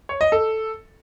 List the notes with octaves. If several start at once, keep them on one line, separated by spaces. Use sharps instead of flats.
C#5
D#5
A4